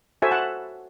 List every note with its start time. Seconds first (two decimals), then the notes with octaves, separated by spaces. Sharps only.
0.22 F#4 A4 C5 E5 G#5
0.31 F#5 A5